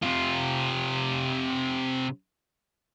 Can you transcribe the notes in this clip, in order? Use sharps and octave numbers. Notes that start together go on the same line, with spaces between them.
C3 F4